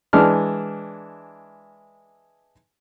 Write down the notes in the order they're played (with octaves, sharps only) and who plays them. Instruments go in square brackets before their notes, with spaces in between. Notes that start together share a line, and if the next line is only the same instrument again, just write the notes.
[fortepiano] E3 G#3 D4 F6